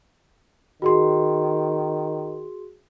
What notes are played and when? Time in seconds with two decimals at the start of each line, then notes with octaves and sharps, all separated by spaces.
0.82 D#3 F#4 G#4 C6